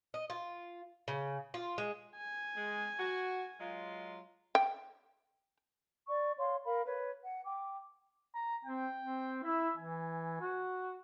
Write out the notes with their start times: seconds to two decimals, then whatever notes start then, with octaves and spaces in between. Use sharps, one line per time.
0.14 D#5
0.30 F4
1.08 C#3
1.54 F4
1.78 G#3
2.17 G#5
2.56 G#3
3.00 F#4
3.61 F#3 G#3 F4
4.55 G5
6.08 D5 C#6
6.37 C#5 F5 C6
6.65 A#4 F5 B5
6.86 B4 C#5
7.22 F#5
7.45 G5 D6
8.34 A#5
8.65 C4 G5
9.00 C4
9.44 E4 E5
9.77 E3 G#5
10.41 F#4